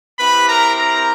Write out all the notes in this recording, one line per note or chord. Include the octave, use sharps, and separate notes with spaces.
C4 E4 G4 B4 B5
A#4 A#5
A#4 A#5